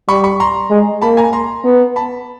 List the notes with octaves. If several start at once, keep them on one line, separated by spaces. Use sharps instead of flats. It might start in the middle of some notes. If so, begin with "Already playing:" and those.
G3 B5 C#6
B5 C#6
A#5 C6
G#3
A#3 A5 B5
G#5 A#5
A#5 C6
B3
A5 B5